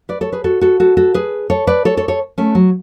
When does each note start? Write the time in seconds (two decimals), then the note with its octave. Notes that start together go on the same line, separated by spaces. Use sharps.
0.09 B4 D5
0.21 A4 C#5
0.32 G#4 B4
0.44 F#4 A4
0.61 F#4 A4
0.80 F#4 A4
0.97 F#4 A4
1.14 G#4 B4
1.50 A4 C#5
1.67 B4 D5
1.85 A4 C#5
1.97 A4 C#5
2.08 A4 C#5
2.38 A3 C#4
2.55 F#3